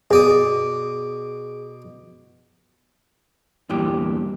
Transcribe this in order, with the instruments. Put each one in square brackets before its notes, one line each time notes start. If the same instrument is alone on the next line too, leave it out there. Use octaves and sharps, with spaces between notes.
[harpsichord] B2 D5 D#6 [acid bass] G#4
[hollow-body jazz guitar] E2 G2 A#2 G4